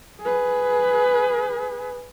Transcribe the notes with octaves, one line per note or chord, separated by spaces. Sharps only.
G#4 B4